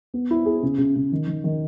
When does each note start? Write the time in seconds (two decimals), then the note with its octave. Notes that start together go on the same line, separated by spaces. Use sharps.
0.14 B3
0.31 E4
0.46 G#4
0.63 C#3
0.78 C#3
0.95 C#3
1.12 D#3
1.27 D#3
1.44 D#3